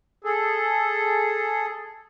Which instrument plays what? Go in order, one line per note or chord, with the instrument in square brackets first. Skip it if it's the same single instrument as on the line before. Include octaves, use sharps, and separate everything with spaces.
[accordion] G#4 A4